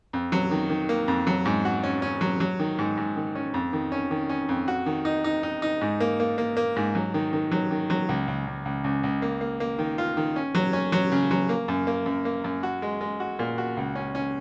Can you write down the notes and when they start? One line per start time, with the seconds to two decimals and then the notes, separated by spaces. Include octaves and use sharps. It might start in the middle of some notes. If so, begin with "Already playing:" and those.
0.13 F2
0.32 F#3
0.51 D#3
0.70 D#3
0.89 A#3
1.08 F2
1.27 F#3
1.45 G#2
1.65 F#4
1.83 C#4
2.02 C#4
2.21 F#3
2.40 F#3
2.59 D#3
2.79 G#2
2.97 G#2
3.16 D#3
3.35 C#4
3.54 F2
3.73 D#3
3.92 C#4
4.11 D#3
4.29 C#4
4.49 F2
4.68 F#4
4.86 D#3
5.05 D#4
5.24 D#4
5.43 D#4
5.62 D#4
5.81 G#2
6.00 A#3
6.20 A#3
6.38 A#3
6.57 A#3
6.76 G#2
6.95 F#3
7.14 D#3
7.33 D#3
7.51 F#3
7.71 D#3
7.90 F#3
8.09 C#2
8.28 C#2
8.47 C#2
8.65 C#2
8.84 C#2
9.03 C#2
9.22 A#3
9.41 A#3
9.60 A#3
9.79 D#3
9.98 F4
10.17 D#3
10.36 C#4
10.55 F#3
10.73 C#4
10.92 F#3
11.12 C#3
11.31 F#3
11.49 A#3
11.68 F#2
11.87 A#3
12.06 F#2
12.25 A#3
12.44 F#2
12.63 F#4
12.82 G#3
13.01 G#3
13.20 F#4
13.39 A#2
13.58 F#4
13.77 C#2
13.95 C#4
14.15 C#4